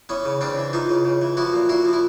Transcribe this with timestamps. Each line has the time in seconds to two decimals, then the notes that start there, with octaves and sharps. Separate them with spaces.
0.09 E3 B3 C#4
0.25 C#3
0.41 C#3 C4 D4
0.58 E3
0.73 E3 D#4 F4
0.89 C#3
1.05 C#3
1.22 E3
1.37 F3 E4 F#4
1.53 A#2
1.69 A#2 E4 F#4
1.85 F3
1.93 E4